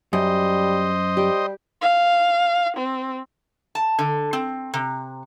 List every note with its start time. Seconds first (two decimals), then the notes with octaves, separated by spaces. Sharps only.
0.13 F#2 G3 C5 D#5
1.17 G3 G4
1.81 F5
2.77 C4
3.75 A5
3.99 D3
4.33 C4
4.74 C3